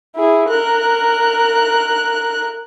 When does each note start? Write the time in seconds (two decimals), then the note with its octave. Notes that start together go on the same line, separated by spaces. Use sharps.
0.15 E4 G#4
0.50 A#4 F#6